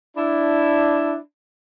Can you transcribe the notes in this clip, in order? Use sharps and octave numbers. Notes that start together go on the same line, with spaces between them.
D4 E4